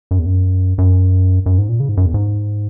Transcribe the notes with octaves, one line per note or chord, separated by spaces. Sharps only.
F#2
E2
F#2
F#2
F#2
G#2
A#2
C#3
G#2
F#2
E2
G#2